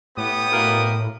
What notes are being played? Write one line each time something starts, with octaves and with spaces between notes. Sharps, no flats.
A2 B3 G4 D#6
B2 A#3 A#4